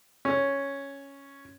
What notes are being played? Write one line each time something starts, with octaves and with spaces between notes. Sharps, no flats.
C#4